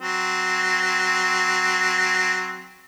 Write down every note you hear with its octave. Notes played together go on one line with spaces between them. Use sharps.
F#3 C4